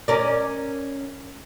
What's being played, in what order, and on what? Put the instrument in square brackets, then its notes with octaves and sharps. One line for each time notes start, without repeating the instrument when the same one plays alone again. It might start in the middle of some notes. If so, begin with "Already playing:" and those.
[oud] C#4 A#4 D5